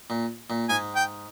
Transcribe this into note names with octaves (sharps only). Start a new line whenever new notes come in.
A#2
A#2
G#2 G#5
G5